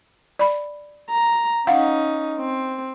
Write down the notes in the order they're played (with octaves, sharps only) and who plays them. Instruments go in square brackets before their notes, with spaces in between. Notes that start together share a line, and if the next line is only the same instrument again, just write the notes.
[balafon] D5 B5
[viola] A#5
[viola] C#4 D#4 [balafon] F5 F#5
[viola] C4